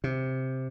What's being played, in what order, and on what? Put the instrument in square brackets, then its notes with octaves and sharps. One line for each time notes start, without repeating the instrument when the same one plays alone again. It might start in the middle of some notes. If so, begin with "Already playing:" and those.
[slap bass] C3